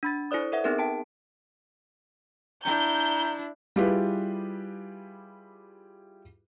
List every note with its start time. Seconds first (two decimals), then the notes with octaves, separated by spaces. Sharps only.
0.03 D4 B5 A6
0.31 E4 A4 C5 D5 D#6
0.52 A4 B4 E5 F#5
0.64 B3 C4 D#4 G#4 A#4
0.78 G5 A5 D7
2.65 D4 E4 A#5 G6
3.76 G3 E4 F4 G4 G#4 B4